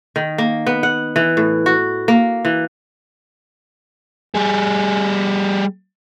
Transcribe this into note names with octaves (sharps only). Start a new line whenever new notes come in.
D#3
A#3
B3
F#5
E3
A2
F#4
A#3
E3
G3 G#4